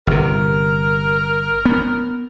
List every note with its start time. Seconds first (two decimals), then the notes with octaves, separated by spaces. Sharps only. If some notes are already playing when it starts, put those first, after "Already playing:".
0.07 G1 C3 A#4
1.65 B3